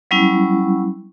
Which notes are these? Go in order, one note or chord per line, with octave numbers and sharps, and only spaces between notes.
F#3 G3 B3 C#4 E4